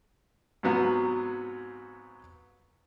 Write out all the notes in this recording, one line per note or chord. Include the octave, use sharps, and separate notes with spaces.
G#2 C3 F#3 B3 F4 F#4